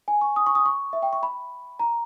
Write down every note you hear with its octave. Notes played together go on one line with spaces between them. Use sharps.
G#5
C#6
D#6
C#6
D#6
C#6
E5
G5
C#6
B5
A#5